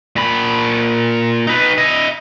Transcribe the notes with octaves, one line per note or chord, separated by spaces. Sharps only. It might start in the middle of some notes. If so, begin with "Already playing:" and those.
A#2 B5
D#4 B4
E4 D#5